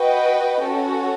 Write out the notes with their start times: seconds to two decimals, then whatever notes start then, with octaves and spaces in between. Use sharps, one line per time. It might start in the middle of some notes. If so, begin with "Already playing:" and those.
Already playing: F#4 B4 D#5 G5
0.63 C#4 F#4 A4